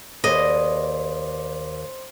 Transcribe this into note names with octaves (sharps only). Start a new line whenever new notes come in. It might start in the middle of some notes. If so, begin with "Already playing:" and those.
D#2 G#4 B4 C5 D5 D#5 C6